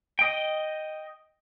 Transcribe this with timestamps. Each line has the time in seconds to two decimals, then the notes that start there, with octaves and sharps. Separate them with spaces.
0.19 D#5 G5